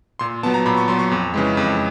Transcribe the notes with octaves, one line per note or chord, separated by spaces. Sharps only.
A#2 C6
F#3 B3 A5
A#5
A#2 B5
C#6
F#3 B3 C6
C#6
F2
C#3 E3 G#3
F2